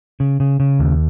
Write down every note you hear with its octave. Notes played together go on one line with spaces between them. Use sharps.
C#3
C#3
C#3
D#2